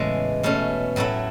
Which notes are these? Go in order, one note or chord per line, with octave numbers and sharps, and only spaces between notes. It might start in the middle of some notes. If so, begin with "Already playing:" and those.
Already playing: E2 A2 C#3 E3 G#3
B2 A3 C#4
A2 F#3 A3 E4